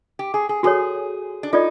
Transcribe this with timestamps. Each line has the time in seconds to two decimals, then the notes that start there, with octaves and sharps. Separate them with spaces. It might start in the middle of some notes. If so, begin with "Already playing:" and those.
0.19 G4
0.34 G#4
0.49 G#4
0.63 F#4 G#4 A4 C#5
1.43 D4
1.53 D#4 F4 A4 D5